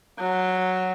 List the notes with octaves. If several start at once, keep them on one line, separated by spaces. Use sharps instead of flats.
F#3